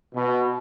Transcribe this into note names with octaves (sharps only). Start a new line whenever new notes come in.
B2